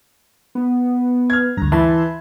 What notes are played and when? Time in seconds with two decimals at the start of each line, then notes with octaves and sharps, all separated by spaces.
0.55 B3
1.30 F6 G#6
1.57 D2 G2 A#5
1.72 E3 E5 A5 B5 C6